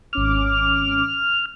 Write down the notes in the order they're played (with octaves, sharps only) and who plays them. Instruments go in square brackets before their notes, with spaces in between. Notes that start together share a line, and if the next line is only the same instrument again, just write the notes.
[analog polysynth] G#1 C#4 D6 [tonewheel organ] F6